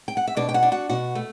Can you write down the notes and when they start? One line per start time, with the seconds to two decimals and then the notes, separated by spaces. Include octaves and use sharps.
0.08 G5
0.17 F#5
0.27 E5
0.37 B2 D4 D5
0.49 G5
0.54 F#4 F#5
0.63 D4
0.72 F#4 F#5
0.89 B2 F#4 F#5
1.15 A3